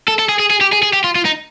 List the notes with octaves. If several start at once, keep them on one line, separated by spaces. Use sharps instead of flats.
A4
A4
G#4
G#4
G#4
G4
G#4
G#4
G4
F4
F4
D#4